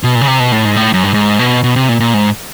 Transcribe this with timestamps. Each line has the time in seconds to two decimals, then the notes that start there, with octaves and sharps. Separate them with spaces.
0.04 B2
0.15 A#2
0.21 C#3
0.27 C3
0.40 B2
0.52 A2
0.65 G#2
0.76 A2
0.94 F#2
1.04 G2
1.14 G#2
1.39 B2
1.64 B2
1.76 C3
1.89 A#2
2.00 A#2
2.14 G#2